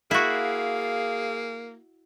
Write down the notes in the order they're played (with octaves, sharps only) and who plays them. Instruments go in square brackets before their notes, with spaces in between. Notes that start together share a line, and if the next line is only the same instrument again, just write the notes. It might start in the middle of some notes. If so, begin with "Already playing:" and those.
[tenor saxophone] A#3 [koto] E4 F#4 [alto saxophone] G#4 [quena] F5